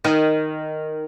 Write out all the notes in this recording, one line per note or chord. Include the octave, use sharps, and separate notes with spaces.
D#3